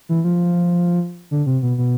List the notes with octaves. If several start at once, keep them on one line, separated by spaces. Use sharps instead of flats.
E3
F3
D3
C3
B2
B2